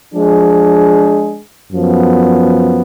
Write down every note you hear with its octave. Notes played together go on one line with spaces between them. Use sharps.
F3 G#3 D4 G#4
F#2 F3 B3